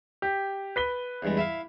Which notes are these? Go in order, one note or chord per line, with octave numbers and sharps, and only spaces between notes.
G4
B4 B6 G7
E2 G2 G#3
E4 E5 F5